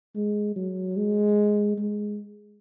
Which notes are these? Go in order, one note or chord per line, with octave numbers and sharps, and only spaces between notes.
G#3
F#3
G#3
G#3